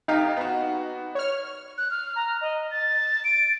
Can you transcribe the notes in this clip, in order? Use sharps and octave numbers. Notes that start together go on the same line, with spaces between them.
F1 D#4 G4 F5
B3 F#4
C#5 F6
F#6
F6
A#5
D#5
A6
D7